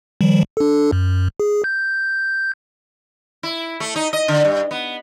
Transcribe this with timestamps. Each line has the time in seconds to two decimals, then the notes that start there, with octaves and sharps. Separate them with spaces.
0.21 D#3 F3 G3
0.57 D4 A4
0.92 F#2
1.40 G#4
1.64 G6
3.43 E4
3.80 A3
3.96 D#4
4.13 D#5
4.28 D3
4.45 G2
4.71 B3